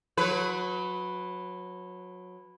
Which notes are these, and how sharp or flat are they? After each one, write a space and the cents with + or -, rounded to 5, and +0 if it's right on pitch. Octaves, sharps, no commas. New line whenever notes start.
F#3 -25 B4 +0